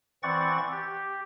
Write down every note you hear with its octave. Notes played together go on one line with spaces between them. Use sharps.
E3 C4 D5 F#5 C#6 A6
G4